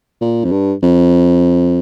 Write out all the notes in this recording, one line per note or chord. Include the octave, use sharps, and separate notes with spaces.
A#2
F2
G2
F2